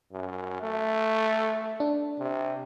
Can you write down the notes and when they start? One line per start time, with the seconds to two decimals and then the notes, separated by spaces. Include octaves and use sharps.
0.13 F#2
0.63 A3
1.80 D4
2.19 C3